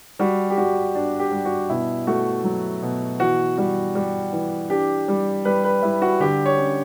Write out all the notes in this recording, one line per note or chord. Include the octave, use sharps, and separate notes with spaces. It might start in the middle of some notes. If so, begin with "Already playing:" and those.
G3 F#4
G4
G3 F#4
D4
G4
G3
F#4
B2 E4
A3 F#4
F#3
B2
E3 F#4
G3 F#4
G3
E3
D4 G4
G3
G3 B4
B4
G3 E4
F#4
D3 G4
C#5
C#4